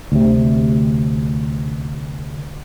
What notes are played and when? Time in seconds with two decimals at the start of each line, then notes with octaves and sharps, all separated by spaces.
0.12 D2 C3